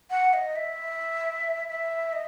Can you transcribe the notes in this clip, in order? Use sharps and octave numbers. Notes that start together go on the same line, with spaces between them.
F#5
D#5
E5
E5
D#5